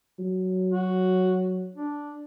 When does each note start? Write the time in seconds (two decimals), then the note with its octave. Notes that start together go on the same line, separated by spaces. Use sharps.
0.19 F#3
0.72 F#4
1.76 D4